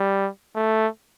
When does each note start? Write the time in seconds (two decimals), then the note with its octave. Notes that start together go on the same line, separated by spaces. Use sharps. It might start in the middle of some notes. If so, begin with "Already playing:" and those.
Already playing: G3
0.56 A3